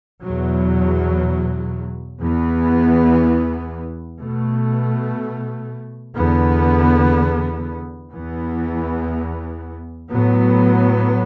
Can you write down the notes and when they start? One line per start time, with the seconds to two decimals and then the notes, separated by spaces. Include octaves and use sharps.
0.22 E2 B2 F#3
2.20 E2 E3 B3
4.17 B2 A3
6.15 E2 D3 B3
8.12 E2 E3 B3
10.10 A2 F#3 B3